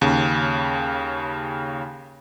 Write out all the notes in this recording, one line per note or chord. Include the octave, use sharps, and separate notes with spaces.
D#2 C#3